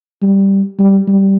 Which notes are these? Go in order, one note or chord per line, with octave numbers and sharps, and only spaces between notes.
G3
G3
G3